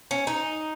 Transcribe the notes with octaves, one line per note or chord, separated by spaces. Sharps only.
C#4
D#4